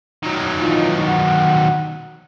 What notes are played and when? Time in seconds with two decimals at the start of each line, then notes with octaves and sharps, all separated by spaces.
0.23 D#3 F#3
0.59 E3 D#4 F4
1.03 F#5